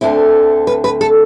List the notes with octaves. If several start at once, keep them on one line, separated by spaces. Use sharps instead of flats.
D2 D3 A3 C4 E4
B4
B4
A4